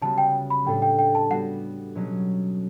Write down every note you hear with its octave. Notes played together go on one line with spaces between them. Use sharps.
C#3 G3 B3 F#4 A5
G5
B5
A2 G3 D4 A4 G5
G5
G5
A5
G3 B3 F#4 F#5
B2 F#3 C#4